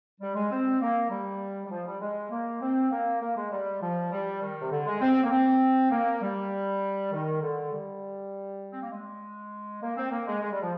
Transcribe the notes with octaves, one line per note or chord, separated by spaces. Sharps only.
G3
G#3
C4
A#3
G3
G3
F3
G3
G#3
A#3
C4
A#3
A#3
G#3
G3
F3
G3
D#3
C3
D3
G#3
C4
A#3
C4
A#3
G3
D#3
D3
G3
C4
A#3
G#3
A#3
C4
A#3
G#3
G#3
G3
F3